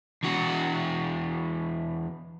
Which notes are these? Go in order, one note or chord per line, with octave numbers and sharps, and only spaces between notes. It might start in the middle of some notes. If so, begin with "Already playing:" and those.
E2 F#4